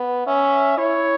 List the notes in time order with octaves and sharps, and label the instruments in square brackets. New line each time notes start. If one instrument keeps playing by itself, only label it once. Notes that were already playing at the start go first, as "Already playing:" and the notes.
Already playing: [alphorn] B3
[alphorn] C#4 [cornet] E5
[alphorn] E4 [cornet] C#5